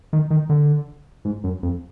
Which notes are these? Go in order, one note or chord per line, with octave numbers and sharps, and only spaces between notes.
D#3
D#3
D3
G#2
F#2
F2